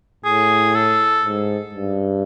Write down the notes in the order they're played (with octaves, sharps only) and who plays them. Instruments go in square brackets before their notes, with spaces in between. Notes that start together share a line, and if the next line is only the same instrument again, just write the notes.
[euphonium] A2 [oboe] G#4
[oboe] A4
[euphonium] G#2
G2